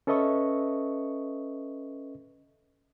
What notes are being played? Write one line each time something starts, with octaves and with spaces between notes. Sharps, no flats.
C#4 A4 B4 D#5 E5 C#6